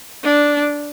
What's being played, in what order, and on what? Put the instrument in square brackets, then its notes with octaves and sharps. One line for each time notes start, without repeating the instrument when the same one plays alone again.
[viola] D4